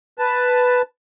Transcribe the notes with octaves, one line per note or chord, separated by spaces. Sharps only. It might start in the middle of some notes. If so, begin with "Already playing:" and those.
B4 A5